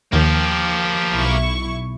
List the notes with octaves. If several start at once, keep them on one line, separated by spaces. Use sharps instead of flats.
D#2 D#3 F3 A#3 G4
B1 E4 C#6